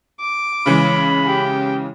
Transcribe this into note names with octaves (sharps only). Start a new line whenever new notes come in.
D6
C#3 E3 G#3 B5
G4